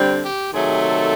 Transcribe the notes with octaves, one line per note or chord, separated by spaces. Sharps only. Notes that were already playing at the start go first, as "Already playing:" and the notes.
Already playing: D3 G3 C4
G4
C3 D#3 F#3 A3 G#4
A4